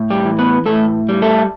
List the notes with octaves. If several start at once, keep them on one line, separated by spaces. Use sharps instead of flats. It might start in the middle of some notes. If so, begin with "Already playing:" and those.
Already playing: A2
G3 G4
E3
B3 B4
A2 A3 A4
G3
A3 A4